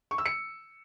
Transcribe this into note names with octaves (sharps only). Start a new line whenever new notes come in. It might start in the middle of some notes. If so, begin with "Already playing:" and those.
C#6
E6
C#7